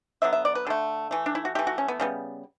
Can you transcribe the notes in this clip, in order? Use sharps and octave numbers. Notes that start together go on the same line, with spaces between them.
D3 F#3 B3 E5
E5
D5
B4
D3 A3 A4
E3 A3
D4
E4
F#4
E3 A3 G4
F#4
C#4
B3
C#3 G3 B3